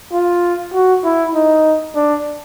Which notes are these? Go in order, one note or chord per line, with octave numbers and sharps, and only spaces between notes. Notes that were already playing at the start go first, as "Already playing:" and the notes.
F4
F#4
E4
D#4
D4